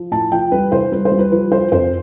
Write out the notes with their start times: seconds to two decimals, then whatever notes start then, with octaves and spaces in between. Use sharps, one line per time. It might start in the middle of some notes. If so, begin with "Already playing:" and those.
Already playing: F3
0.11 A2 A5
0.32 F3 G5
0.52 G3 B4
0.72 E2 C5
0.92 G3 B4
1.05 C5
1.12 G3
1.19 B4
1.32 F3 B4
1.52 F3 C5
1.72 F2 C5